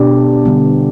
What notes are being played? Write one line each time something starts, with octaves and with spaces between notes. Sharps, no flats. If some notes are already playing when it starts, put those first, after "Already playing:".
Already playing: B2 B3 D4 G4 D5
D3 G3 B3